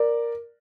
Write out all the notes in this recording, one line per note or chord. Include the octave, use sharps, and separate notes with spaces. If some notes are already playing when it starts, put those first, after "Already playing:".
Already playing: A#4 D5